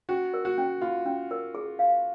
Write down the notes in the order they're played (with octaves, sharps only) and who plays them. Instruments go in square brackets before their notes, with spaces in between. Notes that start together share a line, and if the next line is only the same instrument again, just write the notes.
[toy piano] C#4 [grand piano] F#4
[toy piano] A#4
[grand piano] F#4
[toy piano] C#4
[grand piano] F4 [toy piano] F#4
[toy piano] C#4
A#4
G#4
F5